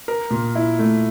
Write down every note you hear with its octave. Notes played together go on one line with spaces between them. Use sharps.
A#4
A#2
E4
A3